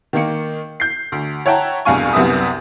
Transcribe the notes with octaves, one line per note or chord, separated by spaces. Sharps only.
D#3 A#3 C#7
G6 C7
D2
C#5 E5 F#5 G5 A5 A#5
E1 C2 G2 F5 G#5 C#6
C2 F#2 C3 B3 E5 D#6